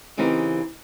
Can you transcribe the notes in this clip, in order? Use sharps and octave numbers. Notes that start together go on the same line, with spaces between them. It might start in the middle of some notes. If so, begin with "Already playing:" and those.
C#3 E3 C4 D#4 G4 A#4